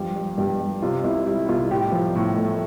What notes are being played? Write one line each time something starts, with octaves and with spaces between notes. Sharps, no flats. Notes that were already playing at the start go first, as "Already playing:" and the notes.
Already playing: G2 F3 G3 G4
G3
G2 G4
G3
C3 F4
C2 E4
G3 E4
C2 F4
A2 G4
F3
A2
A3